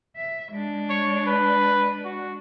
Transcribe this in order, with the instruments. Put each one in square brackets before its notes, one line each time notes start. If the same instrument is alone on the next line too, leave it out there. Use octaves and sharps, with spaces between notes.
[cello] E5
G#3 D4
[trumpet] C#5
B4
F#4